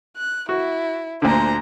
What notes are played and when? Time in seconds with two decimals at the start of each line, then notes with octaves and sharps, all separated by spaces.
0.17 F#6
0.49 E4 F#4
1.22 D2 A#2 D3 C5 A#5